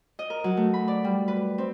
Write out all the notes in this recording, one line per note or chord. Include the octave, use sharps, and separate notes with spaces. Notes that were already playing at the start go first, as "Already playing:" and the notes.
D#5
A#4
F#3
A3
B5
D5
G3
B4
C4